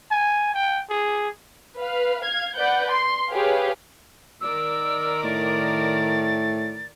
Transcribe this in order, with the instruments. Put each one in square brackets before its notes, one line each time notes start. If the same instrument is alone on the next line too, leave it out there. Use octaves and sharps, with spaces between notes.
[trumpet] G#5
G5
G#4
[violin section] B4 F5
F5 G#6
B4 D5 F#5 G6
C6
G4 G#4 B4 C#5 F5
[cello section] D#3 A#4 D5 [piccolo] E6
[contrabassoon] A2 [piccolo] A6